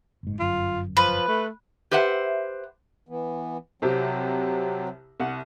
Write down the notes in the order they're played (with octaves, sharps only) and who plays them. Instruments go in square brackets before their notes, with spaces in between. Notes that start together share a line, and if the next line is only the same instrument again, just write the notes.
[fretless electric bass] F#1 G#2
[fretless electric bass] G1 F#2 [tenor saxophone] F4
[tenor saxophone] F3 [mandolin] B4
[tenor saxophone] A3
[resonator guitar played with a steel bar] G4 B4 C5 E5 F#5
[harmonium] E3 B3
[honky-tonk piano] C2 C3 G4 [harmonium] F#3 C4
[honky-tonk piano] C2 F#5